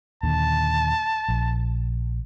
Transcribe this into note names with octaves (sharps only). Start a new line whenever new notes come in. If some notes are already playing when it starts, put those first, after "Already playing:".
D#2 A#2 D3 A5
A#1